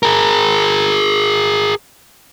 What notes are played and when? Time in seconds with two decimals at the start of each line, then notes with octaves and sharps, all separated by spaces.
0.03 G#4 A#4